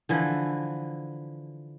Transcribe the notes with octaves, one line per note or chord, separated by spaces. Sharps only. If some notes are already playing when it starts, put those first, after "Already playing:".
D3 E3 F3